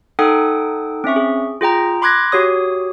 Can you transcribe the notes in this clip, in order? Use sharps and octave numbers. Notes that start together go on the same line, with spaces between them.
D#4 A4 F#5 G5 D#6
C4 C#4 E5 C#6
G#4
F4 G#4 G5 A#5
B5 C6 D6 F#6 G#6 A#6
F#4 G4 C#5 D#6